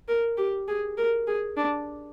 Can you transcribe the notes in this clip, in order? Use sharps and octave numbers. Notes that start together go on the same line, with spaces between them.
A#4
G4
G#4
A#4
G#4
D4